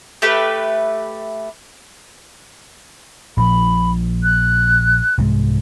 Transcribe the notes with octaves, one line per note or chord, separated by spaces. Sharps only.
A3 G4 B4
A#1 A#2 F3 B5
F#6
C2 G#2 G#3